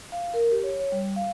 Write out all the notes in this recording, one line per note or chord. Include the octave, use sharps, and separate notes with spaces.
F5
A#4
G4
C#5
C#5
G3
F5